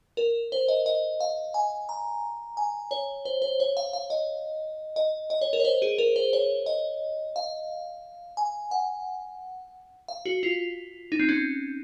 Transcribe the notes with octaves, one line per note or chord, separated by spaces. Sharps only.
A#4
C5
D#5
D#5
F5
G#5
A#5
G#5
C#5
C5
C5
C#5
F5
F5
D#5
D#5
D#5
C#5
A#4
C#5
C5
G#4
A#4
C5
C#5
D#5
F5
G#5
F#5
F5
F#4
F4
D#4
C4
C#4